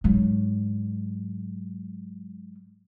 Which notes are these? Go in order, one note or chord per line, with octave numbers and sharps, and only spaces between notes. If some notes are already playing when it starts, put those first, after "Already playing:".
G#2 F#3